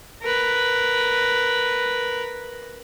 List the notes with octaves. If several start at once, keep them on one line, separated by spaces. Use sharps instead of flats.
A#4 B4